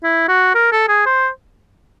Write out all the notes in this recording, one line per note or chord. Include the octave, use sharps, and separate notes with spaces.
E4
F#4
A#4
A4
G#4
C5